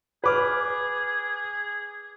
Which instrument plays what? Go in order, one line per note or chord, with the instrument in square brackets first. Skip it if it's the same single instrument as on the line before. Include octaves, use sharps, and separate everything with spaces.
[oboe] G#4 [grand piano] B4 D6 F6